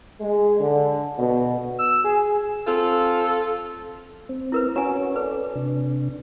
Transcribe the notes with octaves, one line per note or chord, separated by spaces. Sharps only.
G#3
D3
B2
E6
G#4
C4 F4 A4
C4
E4 A#4 B4
C#4 F#4 C#5 G#5 A#5
A4 B4 D5
C3 D4